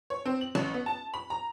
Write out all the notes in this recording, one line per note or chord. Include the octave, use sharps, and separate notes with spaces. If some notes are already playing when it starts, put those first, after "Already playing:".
C#5
C4
F#7
A1
B3
A5
B5
A#5